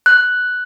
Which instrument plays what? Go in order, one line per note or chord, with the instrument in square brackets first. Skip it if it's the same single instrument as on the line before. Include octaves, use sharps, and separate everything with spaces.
[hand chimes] F#6